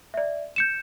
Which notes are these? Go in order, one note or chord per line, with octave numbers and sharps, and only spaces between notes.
D5 E5
G6 C#7 E7